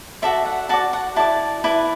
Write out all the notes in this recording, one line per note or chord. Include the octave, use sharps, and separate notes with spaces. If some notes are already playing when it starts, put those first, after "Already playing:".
F#4 A4 D5 E5
F#5
F#4 D5 A5
F#5
E4 D5 A5
E4 B4 D5